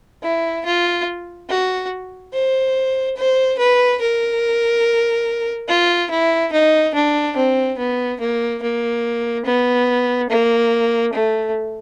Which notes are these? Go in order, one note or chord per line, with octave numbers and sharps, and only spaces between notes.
E4
F4
F#4
C5
C5
B4
A#4
F4
E4
D#4
D4
C4
B3
A#3
A#3
B3
A#3
A3